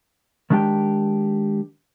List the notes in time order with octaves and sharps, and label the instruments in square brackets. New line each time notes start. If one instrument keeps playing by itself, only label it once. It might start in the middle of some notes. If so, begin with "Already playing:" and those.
[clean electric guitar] D#3 G#3 D4 G4 G5